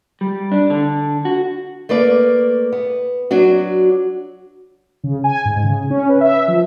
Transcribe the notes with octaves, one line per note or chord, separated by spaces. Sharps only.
G3
D4
D3
F#4
A3 A#3 B4 D5
B3
F#3 D4 F#4
C#3
G#5
G#2
C#3
C#4
B4
E5
F3